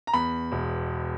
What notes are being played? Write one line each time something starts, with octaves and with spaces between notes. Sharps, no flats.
A#5
E2 B5
E1